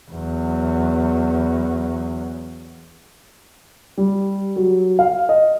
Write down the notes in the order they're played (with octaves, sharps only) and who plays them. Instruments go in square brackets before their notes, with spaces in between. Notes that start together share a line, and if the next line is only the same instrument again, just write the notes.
[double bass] E2 F#3
[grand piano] G3
F#3
F5
D#5